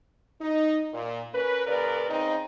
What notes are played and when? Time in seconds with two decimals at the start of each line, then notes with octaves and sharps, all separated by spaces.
0.41 D#4
0.93 A#2
1.34 C#4 A#4 B4
1.67 A#2 C#3 A#4 B4 D5
2.10 C#3 C4 D#4